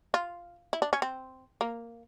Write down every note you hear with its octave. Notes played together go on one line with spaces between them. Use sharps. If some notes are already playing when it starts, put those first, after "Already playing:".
F4
E4
D4
C#4
C4
A#3